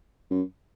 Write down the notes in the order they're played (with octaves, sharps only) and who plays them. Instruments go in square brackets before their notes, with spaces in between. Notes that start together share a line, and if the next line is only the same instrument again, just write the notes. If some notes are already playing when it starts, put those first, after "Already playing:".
[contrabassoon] F#2